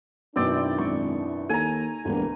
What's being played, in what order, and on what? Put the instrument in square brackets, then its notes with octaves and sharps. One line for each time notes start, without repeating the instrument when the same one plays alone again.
[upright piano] F#2 B2 D#3 [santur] C4 D5 G5 [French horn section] D4 E4
[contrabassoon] G#1 [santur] C#6
[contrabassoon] D#2 [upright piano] A4 [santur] G#5 A#5
[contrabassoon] E1 [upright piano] D2 [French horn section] G3 A#3 B3